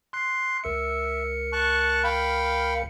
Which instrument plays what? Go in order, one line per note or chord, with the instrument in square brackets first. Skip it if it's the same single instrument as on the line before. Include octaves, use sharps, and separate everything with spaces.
[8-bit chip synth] C6 F#6 C7
[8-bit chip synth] C#2 A#4 C#7 [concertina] E5
[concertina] A5 C#6 F#6
F5 G5 B5